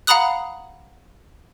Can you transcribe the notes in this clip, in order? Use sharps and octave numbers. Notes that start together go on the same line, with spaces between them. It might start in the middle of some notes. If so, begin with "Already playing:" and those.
F5 F#5 A#5 B5 D#6 F#6